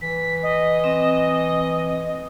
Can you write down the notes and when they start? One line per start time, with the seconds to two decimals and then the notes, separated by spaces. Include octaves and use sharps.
0.01 E3 B6
0.42 D#5
0.84 C4